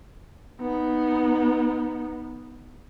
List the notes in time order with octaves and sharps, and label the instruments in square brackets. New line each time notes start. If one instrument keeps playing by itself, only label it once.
[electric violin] B3 D#4